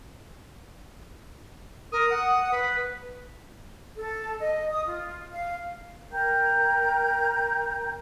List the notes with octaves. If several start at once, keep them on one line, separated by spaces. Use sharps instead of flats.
A#4 D#6
F#5
B4
A4
D#5
D#6
F4
F5
A#4 G5 A#5 G6